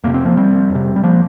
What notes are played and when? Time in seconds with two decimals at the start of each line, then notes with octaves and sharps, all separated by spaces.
0.04 F2 C3 A#3
0.14 C4
0.25 F3 A#3
0.37 G3 C4
0.70 F2
0.75 C3
0.96 G3
1.03 F3 A#3